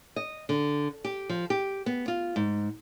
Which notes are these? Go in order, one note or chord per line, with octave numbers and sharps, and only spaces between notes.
D#5
D3
G4
F3
G4
B3
F4
G#2